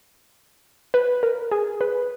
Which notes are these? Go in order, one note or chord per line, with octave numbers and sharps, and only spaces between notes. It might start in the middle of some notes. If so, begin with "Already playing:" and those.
B4
A#4
G#4
B4